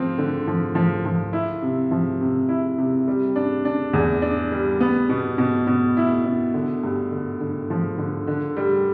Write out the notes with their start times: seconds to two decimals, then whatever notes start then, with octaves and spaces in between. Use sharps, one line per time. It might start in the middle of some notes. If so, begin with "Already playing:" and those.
Already playing: F3 C4
0.18 D3
0.47 F3
0.75 F3
1.05 F3
1.33 E4
1.62 C3
1.91 F3
2.21 C3
2.49 E4
2.78 C3
3.08 G3
3.36 D4
3.65 D4
3.93 E2
4.22 D4
4.52 G3
4.80 B3
5.09 B2
5.38 B2
5.67 B2
5.97 E4
6.25 B2
6.54 D3
6.83 G2
7.11 D3
7.40 D3
7.70 F3
7.98 D3
8.27 D3
8.57 G3